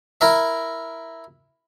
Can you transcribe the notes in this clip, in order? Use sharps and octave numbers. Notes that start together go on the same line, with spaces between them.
E4 A#4 E5